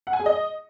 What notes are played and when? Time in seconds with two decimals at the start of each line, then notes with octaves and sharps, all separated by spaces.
0.07 F#5
0.13 G#5
0.20 G#4
0.26 D#5